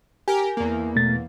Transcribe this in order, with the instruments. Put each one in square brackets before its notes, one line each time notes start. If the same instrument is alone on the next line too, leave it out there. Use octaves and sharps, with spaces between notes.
[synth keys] G4 A#4 [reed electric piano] G#5
[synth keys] E2 A#3
[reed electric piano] B2 A3 A6